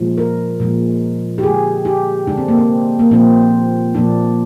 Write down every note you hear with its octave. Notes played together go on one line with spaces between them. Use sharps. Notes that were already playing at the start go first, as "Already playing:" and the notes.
Already playing: A#2 F3 G#3
A#4
A#2 F3 G#3
G4
D3 G#3 G#4
G4
D3 G#3 D4
C4
A#3
C4
A#3
A#2 F3 A#3 C4
A#2 F3 A#3 D4